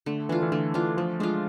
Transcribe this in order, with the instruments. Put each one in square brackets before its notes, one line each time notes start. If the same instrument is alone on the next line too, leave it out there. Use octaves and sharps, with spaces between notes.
[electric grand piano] D3 [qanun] A3
[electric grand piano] E3 [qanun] D4 F4
[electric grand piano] E3
[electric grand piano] D3 [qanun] A3
[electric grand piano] E3 [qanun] D4 F4
[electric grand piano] F3 [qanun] A3
[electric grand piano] G#3 [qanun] D4 F4